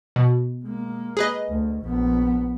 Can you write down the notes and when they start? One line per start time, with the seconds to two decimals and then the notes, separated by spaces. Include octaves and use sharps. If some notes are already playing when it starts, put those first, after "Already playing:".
0.16 B2
0.64 G#3 A#3
1.17 G#4 B4 D#5
1.49 D2
1.83 A#1 B3